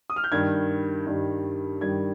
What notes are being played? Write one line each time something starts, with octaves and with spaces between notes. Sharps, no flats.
D#6
F6
G6
G2 D#3 G3 G#6
G2 D#3 G3
G2 D#3 G3 G#6